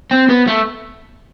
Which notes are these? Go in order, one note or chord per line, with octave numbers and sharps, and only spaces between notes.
C4
B3
A3